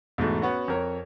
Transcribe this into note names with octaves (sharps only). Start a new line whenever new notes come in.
E2 G#2 B2 A3 D#4
B3 C#4 F#4
F2 A#4 C#5